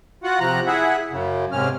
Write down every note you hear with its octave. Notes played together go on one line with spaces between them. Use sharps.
F4 F#4 F#5
C3 F3 A#5 F#6
E4 G#4 E5 F#5
F#2 C#3
G#2 C3 C#4 F6